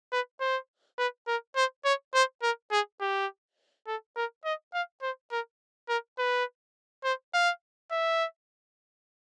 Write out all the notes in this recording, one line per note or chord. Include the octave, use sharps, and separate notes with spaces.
B4
C5
B4
A#4
C5
C#5
C5
A#4
G#4
G4
A4
A#4
D#5
F5
C5
A#4
A#4
B4
C5
F5
E5